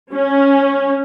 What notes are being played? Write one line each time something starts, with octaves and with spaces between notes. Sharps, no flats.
C#4